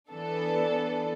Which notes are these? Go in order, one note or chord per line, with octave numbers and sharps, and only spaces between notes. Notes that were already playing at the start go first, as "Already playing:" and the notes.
E3 B3 D4 A4